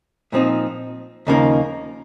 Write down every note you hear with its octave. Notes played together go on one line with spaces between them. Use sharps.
A#2 F3 C4 D#4
D#2 C#3 F3 A#3 D#4